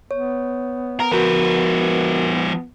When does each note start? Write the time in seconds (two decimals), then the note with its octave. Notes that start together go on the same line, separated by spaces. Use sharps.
0.11 B3 C#5
1.00 A#4
1.12 F3 F#4 A#4 B4